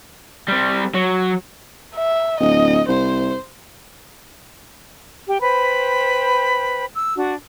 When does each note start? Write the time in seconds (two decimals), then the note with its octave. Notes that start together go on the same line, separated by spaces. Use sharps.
0.48 G3 C4
0.94 F#3
1.95 E5
2.40 D1 D#5
2.89 C2 C5
5.27 G4
5.41 B4 C5 G5 B5
6.93 E6
7.15 D4 F#4